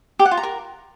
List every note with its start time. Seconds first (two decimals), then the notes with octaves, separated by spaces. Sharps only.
0.19 G4
0.25 F#5
0.31 F4
0.37 A#5
0.43 A#4